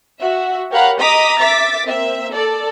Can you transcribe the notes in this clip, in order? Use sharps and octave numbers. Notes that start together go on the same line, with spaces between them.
F#4 E5
G4 A#4 C#5 F5 F#5 B5
D#5 A#5 D6 D#6 B6
E5 D6 A6 B6
A#3 C4 E5
A4 D5